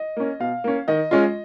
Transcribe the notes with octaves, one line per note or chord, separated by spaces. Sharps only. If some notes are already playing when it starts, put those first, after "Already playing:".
Already playing: D#5
A#3 C#4
B2 F5
A#3 C#4
D#3 D#5
G#3 C#4 F4